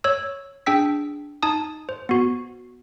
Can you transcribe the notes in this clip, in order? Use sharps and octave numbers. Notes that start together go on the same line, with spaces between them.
C#5 E6
D4 G#4 G5 E6 B6
D#4 A5 D#6
C5
B3 F#4